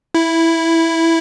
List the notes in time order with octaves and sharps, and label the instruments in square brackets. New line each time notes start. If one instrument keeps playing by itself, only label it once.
[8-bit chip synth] E4